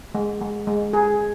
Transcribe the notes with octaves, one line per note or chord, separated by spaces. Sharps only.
G#3
G#3
G#3
G#4